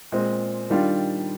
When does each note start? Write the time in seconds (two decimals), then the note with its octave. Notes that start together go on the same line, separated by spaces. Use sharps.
0.12 A#2 G#3 C4
0.70 D#3 G3 D4 F4